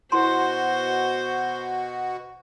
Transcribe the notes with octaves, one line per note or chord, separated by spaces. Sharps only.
B2 E4 F#4 C5 A#5 C6